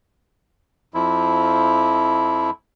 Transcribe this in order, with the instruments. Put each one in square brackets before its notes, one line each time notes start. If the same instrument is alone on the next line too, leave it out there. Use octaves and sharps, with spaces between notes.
[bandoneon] F2 F3 E4